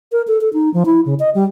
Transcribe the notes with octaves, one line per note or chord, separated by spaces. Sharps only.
A#4
A4
A4
D#4
F3
E4
C#3
D#5
G3